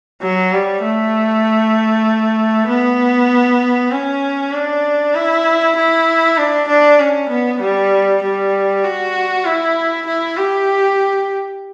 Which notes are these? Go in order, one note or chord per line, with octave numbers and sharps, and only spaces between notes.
F#3
G3
A3
B3
C#4
D4
E4
E4
D4
D4
C#4
B3
G3
G3
F#4
E4
E4
G4